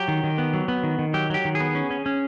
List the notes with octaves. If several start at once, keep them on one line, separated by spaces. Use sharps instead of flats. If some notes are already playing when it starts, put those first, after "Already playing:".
Already playing: F#3 G4
D#3
D#3
B3
F#3
B3
D#3
D#3
F#3 G4
F#3 G4
D#3
G#4
B3
C#4
C#4
C#4